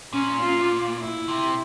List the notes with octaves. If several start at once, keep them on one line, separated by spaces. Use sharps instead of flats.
A#2 C#4
F4
E4
C3